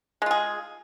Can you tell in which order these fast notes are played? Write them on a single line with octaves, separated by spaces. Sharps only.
G#3 F4 G#4